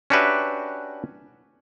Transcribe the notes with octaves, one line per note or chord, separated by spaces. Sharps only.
C#4 D4 F#4 G4 B4 E5